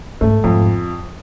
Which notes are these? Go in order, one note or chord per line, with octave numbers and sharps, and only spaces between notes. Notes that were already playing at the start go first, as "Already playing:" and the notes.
G#2 A3
F2 G#2